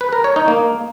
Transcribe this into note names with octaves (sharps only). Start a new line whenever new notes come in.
B4
A#4
C#5
D#4
A#3